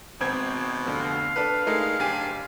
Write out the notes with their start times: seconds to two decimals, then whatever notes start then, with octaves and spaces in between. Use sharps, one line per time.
0.21 G#1 B2 C4 G#6
0.85 F1 D3 F5
1.36 D4 A4 B4
1.67 G#3 A3 D#4 A#4
1.99 F#1 D4 G4 G#5